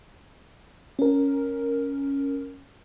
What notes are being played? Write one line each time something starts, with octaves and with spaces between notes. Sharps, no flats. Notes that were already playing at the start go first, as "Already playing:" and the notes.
C#4 A#4